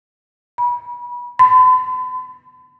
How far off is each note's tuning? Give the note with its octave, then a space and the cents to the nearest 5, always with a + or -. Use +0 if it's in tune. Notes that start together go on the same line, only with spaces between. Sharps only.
B5 -30
B5 +45